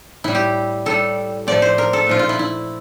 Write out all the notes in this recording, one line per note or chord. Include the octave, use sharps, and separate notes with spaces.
A2 G3 E4
G4
A2 G3 A4
A2 F3 A3 D5
C5
A#4
A4
A#2 F3 A3 F4
F4
E4
E4